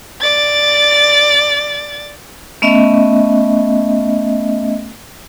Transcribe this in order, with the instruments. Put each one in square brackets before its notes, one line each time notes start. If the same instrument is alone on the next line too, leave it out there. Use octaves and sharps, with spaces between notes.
[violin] D5 A6
[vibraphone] A3 B3 C#4 D#5 E5